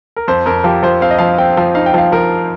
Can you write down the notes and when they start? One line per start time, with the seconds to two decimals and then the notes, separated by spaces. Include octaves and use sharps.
0.16 A#4
0.28 F2 C5
0.46 F2 A#4
0.64 F3 G4
0.83 F3 C5
1.01 C4 F5
1.11 D#5
1.19 F3 F5
1.38 C4 G5
1.57 F3
1.75 D#4 F5
1.86 G5
1.94 F3 F5
2.12 F3 A#4